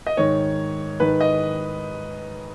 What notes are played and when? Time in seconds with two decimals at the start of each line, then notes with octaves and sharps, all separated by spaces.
0.07 D#5
0.17 G#2 D#3 C#5
1.00 G#2 D#3 B4
1.21 D#5